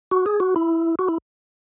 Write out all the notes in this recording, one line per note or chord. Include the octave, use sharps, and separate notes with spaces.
F#4
G#4
F#4
E4
F#4
E4